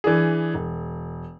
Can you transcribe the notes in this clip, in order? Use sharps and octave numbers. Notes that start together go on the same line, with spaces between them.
E3 D4 E4 G#4
E1